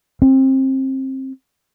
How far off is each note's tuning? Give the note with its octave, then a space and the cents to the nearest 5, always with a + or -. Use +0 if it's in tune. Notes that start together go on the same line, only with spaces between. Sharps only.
C4 +25